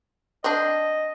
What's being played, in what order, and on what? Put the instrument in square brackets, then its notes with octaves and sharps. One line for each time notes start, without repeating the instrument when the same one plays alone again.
[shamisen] C4 D4 [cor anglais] D#5